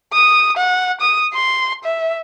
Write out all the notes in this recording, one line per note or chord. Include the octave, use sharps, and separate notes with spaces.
D#6
F#5
D#6
C6
E5